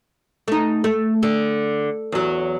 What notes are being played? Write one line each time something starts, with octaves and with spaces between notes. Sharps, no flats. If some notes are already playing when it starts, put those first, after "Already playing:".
A3 D#4
A3
D3
E2 F#3